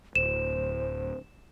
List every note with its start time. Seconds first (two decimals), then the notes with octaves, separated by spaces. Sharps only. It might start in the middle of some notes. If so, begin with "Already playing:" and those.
0.15 D1 C5 E7